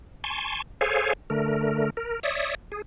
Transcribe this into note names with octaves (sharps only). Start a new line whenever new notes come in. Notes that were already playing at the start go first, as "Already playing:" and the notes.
G#5 A5 C6 C#6
G#4 A4 C5 C#5 F5 G#5
D3 A3 A#4
A#4
C#5 D5 E5 D#6
G#4